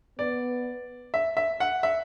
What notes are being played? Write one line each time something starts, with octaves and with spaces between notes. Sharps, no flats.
B3 D5
E5
E5
F#5
E5